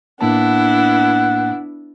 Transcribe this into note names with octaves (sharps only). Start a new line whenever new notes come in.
A2 A#3 B3 D4 E4 F#5 A5